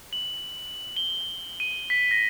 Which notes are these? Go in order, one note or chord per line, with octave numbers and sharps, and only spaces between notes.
F#7
G7
D#7
B6
A#6